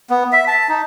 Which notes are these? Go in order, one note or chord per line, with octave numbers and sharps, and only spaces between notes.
B3
E5
A5
D#4